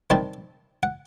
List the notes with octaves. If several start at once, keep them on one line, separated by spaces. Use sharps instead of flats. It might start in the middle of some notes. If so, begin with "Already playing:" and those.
C3 D#3 G3 C4 A5
F#5